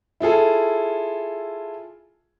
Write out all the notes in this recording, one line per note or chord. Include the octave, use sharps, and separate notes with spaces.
E4 F4 G#4 A4